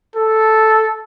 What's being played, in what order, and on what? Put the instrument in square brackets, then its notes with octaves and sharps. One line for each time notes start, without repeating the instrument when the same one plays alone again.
[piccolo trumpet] A4